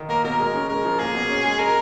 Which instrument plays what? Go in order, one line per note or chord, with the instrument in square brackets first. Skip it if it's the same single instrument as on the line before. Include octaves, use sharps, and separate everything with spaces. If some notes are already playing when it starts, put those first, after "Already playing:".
Already playing: [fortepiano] D#3
[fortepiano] A#3 [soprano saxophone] A#4
[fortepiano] B2 [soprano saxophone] A#4
[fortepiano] G#3
C#3
[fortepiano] G#3 [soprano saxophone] A#4
[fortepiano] F3
[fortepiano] A#3 [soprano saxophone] G#4
[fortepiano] B2
C#4
G#3
[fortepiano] G#3 [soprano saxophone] A#4